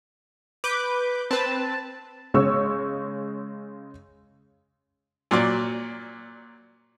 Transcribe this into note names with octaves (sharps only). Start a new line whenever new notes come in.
B4 D6 G6
C4 B4 A5
C#3 G#3 C#5 C#6 E6
A#2 F#3 D5